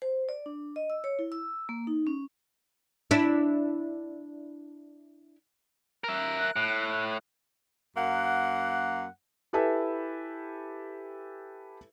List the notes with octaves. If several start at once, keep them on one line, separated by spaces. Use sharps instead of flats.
C5
D5
D4
D#5
E6
C#5
E4
E6
A#3
D#4
C#4
D4 E4
A#4 E5 F#6
A2
F#2 A#3 F#5
E4 G4 A4 B4 E5 G#5